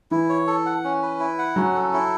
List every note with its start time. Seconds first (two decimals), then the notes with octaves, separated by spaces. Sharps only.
0.11 E3 E4
0.29 C#5
0.47 A4
0.66 F#5
0.84 C#4
1.02 B4
1.20 E4
1.38 F#5
1.56 F#3 C#4
1.75 A4
1.93 E4